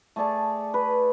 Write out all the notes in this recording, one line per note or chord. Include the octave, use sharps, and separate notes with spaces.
A3 G#4 D5 A5
B4